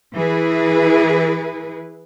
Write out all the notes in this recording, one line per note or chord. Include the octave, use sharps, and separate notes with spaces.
E3 E4 G#4 B4